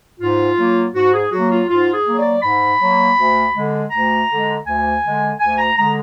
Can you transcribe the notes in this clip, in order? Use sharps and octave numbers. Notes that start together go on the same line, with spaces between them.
G#2 F4
F#3 A#3
G#2 F#4
G#4
F#3 A#3 F#4
F4
G#2 F4
G#4
F#3 A#3
D5
G#2 B5
F#3 A#3
D2
D3 G#3
D2 A#5
D3
G#3
D2 G#5
D3 G#3
D2 G#5
A#5
D3 G#3 A#5